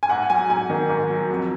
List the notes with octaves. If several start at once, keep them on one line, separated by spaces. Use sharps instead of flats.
G#5
G#2 F#5
F#3 G#5
G#2 G#5
D#3
G#2
F#3
F2